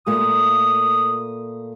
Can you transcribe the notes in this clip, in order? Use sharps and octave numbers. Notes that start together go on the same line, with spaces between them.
A#2 A3 A#3 D#6